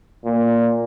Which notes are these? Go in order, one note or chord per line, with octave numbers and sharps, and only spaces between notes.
A#2